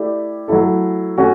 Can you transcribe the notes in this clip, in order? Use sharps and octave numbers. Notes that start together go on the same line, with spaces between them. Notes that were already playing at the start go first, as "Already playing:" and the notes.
Already playing: A3 E4 G4 D5
F#3 A3 E4 A4
A3 C#4 F#4